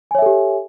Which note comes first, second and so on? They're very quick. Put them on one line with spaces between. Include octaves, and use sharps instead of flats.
G#5 C#5 E5 A4 G4